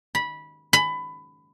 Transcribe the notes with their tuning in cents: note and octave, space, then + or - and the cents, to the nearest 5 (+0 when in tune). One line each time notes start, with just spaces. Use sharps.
B5 -15
B5 +20